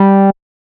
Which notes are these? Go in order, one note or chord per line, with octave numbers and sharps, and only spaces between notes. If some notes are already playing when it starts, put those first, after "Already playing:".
Already playing: G3